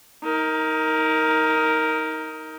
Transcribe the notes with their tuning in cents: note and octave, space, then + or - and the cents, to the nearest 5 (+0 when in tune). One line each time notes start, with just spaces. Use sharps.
D#4 +25 A#4 +0